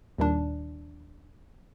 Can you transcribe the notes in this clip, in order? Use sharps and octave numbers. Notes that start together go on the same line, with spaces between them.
D#2 A#2 D#3 G3 D4